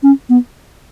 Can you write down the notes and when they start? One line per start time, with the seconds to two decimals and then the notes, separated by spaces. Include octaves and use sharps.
0.03 C#4
0.29 B3